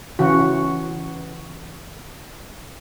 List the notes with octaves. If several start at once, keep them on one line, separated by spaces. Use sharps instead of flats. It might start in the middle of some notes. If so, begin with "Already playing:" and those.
C#3 E3 F#4